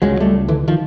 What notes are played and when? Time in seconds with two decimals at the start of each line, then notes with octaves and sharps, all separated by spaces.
0.02 C#2 C#3 F#3 G#3
0.20 G3 A3
0.48 D3 E3
0.68 D#3 F3